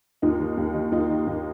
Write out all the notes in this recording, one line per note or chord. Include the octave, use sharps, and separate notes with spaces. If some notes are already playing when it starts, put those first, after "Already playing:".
D#2 D#4 F4
D#3
D#2
D#3
D#2 D#4 F4
D#3
D#2